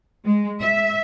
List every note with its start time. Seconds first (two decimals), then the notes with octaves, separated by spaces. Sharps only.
0.25 G#3
0.60 E5